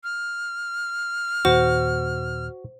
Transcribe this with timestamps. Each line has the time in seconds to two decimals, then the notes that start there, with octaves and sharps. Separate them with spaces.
0.04 F6
1.45 D#2 A#2 F#4 C5